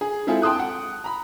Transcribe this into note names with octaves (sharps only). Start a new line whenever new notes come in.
G#4
G#3 C4 E4 F4 G#4 A4
G5 A5 C6 D#6 F#6
F#5
A#5 B5